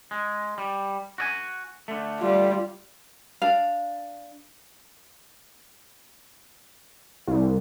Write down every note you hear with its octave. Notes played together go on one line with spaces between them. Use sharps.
G#3
G3
F#4 D5 G#5
D3 A3
G3 F4
D4 F5
C2